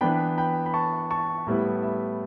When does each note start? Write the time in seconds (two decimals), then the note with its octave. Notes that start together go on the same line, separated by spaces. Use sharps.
0.01 E3 B3 D4 G5 B5
0.38 G5 B5
0.66 B5
0.74 A5 C#6
1.10 A5 C#6
1.47 A2 G3 B3 E4
1.82 E5